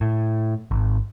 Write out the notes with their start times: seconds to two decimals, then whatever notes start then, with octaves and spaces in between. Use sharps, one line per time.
0.01 A2
0.71 G#1